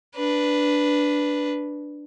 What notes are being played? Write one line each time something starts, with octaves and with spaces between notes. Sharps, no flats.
D4 B4